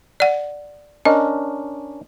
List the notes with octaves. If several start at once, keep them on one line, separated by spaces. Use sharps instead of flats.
D5 F#5
C#4 D4 A#4 D#5